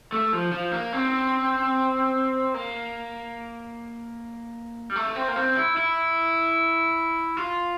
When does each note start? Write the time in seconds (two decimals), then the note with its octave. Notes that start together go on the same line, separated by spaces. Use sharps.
0.12 A3
0.33 F3
0.52 F3
0.72 A#3
0.93 C4
2.54 A#3
4.90 G3
4.96 A3
5.16 C4
5.28 A#3
5.36 C4
5.57 E4
5.77 E4
7.37 F4